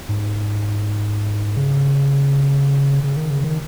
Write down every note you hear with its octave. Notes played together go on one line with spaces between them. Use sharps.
G#2
C#3
C#3
D#3
C#3
D#3